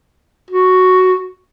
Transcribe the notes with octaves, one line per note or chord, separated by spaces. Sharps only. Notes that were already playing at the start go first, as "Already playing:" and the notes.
F#4